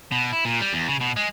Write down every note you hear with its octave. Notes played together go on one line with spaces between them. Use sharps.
B2
E4
A#2
G3
E2
C#3
B2
G#3